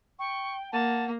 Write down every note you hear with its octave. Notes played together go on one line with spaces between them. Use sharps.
G5 C#6
A#3 F#5 A5